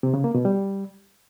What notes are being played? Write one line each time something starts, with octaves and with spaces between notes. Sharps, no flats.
C3
C#3
A#3
B2
G3